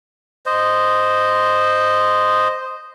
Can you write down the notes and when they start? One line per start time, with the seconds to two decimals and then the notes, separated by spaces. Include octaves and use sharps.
0.46 C5 D#5